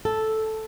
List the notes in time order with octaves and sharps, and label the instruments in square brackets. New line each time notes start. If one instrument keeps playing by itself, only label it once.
[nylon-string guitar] A4